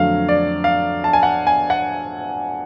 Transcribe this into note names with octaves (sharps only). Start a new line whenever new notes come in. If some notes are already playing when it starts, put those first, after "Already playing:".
Already playing: F2 D3 F#3 A3 F5
D5
F5
A5
G#5
F#5
G#5
F#5